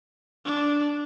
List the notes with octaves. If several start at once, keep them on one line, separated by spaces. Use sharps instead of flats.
D4